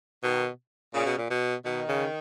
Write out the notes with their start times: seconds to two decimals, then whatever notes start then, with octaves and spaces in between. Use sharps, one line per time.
0.23 B2 D#3
0.94 A#2 C#3
1.06 B2
1.18 A#2
1.30 B2
1.65 B2 D#3
1.88 C#3